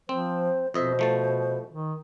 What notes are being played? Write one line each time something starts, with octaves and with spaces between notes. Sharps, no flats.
F3 C4 C5
F2 B2 C5 D#5 E5
F3 A3 A5
D#3